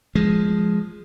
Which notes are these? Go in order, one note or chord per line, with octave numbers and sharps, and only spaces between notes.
F3 G#3